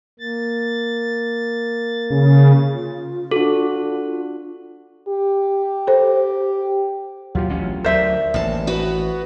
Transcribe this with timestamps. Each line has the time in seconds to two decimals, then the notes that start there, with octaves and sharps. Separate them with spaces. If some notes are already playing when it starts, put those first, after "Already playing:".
0.19 A#3 A6
2.10 C#3
2.74 F4
3.31 D4 F#4 A4
5.08 G4
5.87 A4 C5
7.35 D#2 A#2 F#3 F4 G4
7.50 A1 D2 C#4
7.84 D2 F#3 A#4 C5 D5 E5 G6
8.34 A1 D#2 A5
8.67 B3 F#4 B4